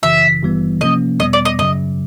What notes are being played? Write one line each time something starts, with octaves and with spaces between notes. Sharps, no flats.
G#1 F#2 C#3 E3 E5
G#1 G2 E3 G3 B3
C3 F3 A#3 C#4 D#5
E2 B2 G3 B3 D#5
D5
D#5
F#2 C#3 F#3 D#5